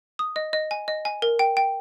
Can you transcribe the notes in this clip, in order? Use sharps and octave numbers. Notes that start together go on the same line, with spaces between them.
D#6
D#5
D#5
G#5
D#5
G#5
A#4
G5
G5